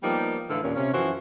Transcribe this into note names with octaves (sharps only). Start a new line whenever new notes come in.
F3 G3 A#3 B3 D#4 G4
A2 D3 E3 A4 F5
D#2 A#2 C#4
C3 C#4
F#2 E3 F3 F#4 C5